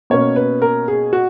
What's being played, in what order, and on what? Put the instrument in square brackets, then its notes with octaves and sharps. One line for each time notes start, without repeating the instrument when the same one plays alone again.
[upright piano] B2 A#3 C#4 C#5
B4
A#4
G#4
F#4